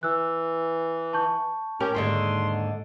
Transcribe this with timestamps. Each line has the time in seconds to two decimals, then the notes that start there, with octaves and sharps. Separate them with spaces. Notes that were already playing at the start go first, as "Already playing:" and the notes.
0.03 E3 E6 F#6
1.13 A5 C#6 G6
1.80 C#4 G4 A#4
1.94 D#2 G#2 D3 C6